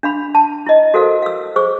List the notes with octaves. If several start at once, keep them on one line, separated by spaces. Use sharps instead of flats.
D4 F5 B5
A5
E4 D#5
F#4 A4 A#4 C5 F5
F5 E6
G#4 C5 C#6 E6